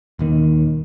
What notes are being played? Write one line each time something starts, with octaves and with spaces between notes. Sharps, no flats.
D#1 D#2 D#3